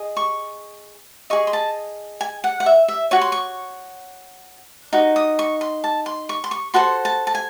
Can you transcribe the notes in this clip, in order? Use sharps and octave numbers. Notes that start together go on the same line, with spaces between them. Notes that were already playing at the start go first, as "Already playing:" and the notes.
Already playing: G#4 D#5
C#6
G#4 D#5 C#6
C6
A5
G#5
F#5
F#5
E5
E5
F#4 C#5 C#6
C6
C#6
D#4 F#4
D#6
C#6
C6
A5
C6
C#6
C6
C#6
F#4 A4 C5 C6
A5
A5
G#5